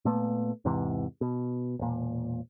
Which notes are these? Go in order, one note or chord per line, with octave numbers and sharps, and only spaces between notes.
A#2 A3 B3
E2 G#2 C3 E3
B2
E1 A#2